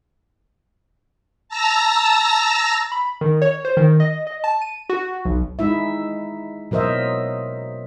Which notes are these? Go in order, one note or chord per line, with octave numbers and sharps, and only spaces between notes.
A5 A#5 E6 A#6
B5
D#3
C#5
C5
D#3
D#5
D#5
A5
D#7
F#4
B1
G#3 D#4 E4 E5
B2 F#3 A#4 C5 D#5 E5